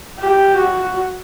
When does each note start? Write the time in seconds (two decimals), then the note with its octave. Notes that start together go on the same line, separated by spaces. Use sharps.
0.19 G4
0.56 F#4